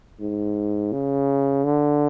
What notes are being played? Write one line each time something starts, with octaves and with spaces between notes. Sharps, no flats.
G#2
C#3
D3